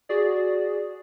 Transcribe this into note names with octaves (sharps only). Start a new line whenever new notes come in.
F#4 G#4 D5